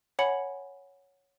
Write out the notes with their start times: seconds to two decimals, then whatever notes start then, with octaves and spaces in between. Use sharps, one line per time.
0.19 C#5 F#5 G#5 B5 C#7 F#7